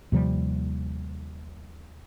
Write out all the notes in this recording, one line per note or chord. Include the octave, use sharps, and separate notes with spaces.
D#2 C3 F3 G3